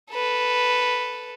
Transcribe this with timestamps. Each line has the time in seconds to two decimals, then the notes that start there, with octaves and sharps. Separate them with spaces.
0.12 A4 B4